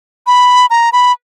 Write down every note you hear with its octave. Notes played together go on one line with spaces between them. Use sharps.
B5
A#5
B5